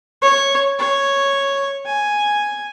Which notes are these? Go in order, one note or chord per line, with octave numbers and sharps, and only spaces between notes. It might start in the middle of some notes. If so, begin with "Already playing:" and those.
C#5
C#5
G#5